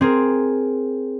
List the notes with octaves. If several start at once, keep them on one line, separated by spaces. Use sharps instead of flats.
C4 G#4 A#4